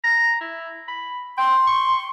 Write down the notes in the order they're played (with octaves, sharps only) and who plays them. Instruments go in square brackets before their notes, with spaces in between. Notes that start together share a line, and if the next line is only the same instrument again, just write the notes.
[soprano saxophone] A#5
E4
B5
[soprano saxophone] G5 [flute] C6
[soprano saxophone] C#6